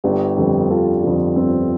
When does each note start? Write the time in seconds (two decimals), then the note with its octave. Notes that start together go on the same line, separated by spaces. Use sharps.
0.04 G1 D4 G4
0.37 F2 D3 G3
0.69 G1 F4 A4
1.03 F2 D3 G3
1.36 G1 C4